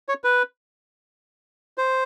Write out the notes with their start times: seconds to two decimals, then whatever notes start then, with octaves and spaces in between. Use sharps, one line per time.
0.09 C#5
0.24 B4
1.78 C5